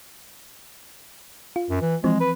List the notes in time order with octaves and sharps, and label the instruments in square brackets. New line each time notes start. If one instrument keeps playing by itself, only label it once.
[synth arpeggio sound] F4
[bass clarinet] F#2
E3
[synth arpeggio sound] E3 F3 C4 [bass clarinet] G#3
[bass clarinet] B4